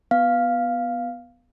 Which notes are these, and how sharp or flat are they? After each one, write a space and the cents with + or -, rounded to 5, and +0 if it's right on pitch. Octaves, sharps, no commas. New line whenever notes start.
B3 +0 F5 +0